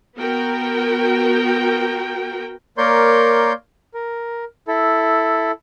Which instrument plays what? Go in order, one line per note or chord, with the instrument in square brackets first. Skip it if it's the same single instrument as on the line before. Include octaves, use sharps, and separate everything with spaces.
[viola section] B3 F#4 A#4 G5
[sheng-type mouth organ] A#3 A#4 C#5 D5 C6 G6
A#4
E4 A4